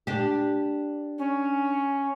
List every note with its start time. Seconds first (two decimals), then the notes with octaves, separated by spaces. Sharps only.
0.07 D4 G4
1.18 C#4